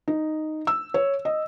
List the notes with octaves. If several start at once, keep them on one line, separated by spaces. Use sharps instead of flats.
D#4
E6
C#5
D#5